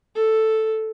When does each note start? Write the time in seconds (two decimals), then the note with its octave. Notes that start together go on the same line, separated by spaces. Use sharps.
0.16 A4